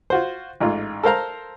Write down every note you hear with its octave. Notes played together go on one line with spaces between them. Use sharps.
F4 F#4 C5
A1 G#2 F4
A4 A#4 C5 F5 A#5